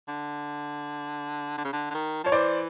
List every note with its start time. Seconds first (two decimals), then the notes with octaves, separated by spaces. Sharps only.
0.08 D3
1.58 D3
1.65 C#3
1.73 D3
1.90 D3
1.94 D#3
2.24 F3 C#5
2.32 E3 C5 D5